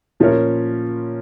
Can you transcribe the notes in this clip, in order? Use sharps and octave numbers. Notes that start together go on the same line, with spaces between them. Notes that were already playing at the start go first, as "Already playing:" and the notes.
A#2 F3 C#4 A#4 C#5